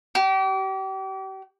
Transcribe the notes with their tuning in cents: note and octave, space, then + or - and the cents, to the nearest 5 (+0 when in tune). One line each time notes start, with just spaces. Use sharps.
G4 -35